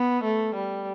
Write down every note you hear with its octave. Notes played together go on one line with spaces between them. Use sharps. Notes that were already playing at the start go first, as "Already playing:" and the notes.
Already playing: B3
A3
G3